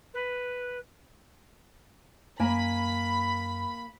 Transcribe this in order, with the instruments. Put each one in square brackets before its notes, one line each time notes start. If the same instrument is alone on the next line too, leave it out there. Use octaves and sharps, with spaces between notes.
[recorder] B4
[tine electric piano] F#2 [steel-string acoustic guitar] A#3 G#5 [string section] B5